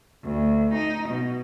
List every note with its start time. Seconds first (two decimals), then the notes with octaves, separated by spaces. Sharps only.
0.23 D2
0.74 D#4
1.09 B2